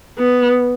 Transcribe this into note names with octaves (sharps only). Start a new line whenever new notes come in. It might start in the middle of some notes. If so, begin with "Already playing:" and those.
B3